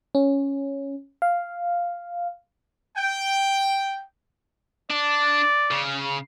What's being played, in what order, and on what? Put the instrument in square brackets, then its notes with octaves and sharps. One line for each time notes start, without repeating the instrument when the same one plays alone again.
[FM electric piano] C#4
F5
[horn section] G5
[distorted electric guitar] D4 [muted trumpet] D5
[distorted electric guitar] C#3